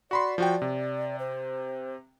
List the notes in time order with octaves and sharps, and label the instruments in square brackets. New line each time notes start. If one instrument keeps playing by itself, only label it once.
[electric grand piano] F#4 B5 C6 [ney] D5
[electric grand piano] F3 F#4 G5
C3
[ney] C5